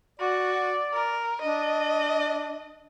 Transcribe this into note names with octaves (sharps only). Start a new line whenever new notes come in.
F#4 D5
A#4
D4 D#5